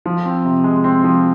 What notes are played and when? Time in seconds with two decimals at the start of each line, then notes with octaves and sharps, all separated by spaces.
0.06 F3
0.25 C4
0.45 C3
0.64 G#3
0.84 C4
1.04 F3